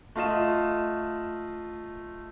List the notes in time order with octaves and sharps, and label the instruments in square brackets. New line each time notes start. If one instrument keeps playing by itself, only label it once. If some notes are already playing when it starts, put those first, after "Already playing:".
[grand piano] A3 F4 D#5 E7